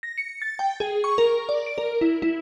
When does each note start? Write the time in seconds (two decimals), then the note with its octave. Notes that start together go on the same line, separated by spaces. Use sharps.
0.03 A#6
0.18 C#7
0.42 A6
0.59 G5
0.80 G#4
1.04 C#6
1.18 A#4
1.49 D5
1.66 D7
1.78 A#4
2.01 E4
2.22 E4